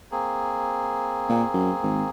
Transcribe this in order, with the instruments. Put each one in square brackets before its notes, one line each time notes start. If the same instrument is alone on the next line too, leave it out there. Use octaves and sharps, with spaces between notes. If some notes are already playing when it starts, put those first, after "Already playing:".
[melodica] A#3 C4 G#4
[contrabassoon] A#2
F#2
G#1